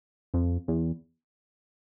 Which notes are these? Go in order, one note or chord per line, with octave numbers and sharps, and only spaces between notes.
F2
E2